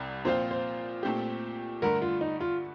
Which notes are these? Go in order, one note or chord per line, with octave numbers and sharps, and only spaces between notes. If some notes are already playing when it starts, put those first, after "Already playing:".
Already playing: C2 C3 G3
A#2 F3 C4 F4 C5
C5
A#2 A3 C4 G4
G2 D3 A3 A#4
F4
D#4
F4